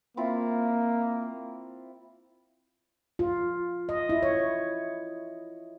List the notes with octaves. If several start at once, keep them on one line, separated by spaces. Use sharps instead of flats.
A#3 C4 E4 F4
F4
D#5
E4
C#5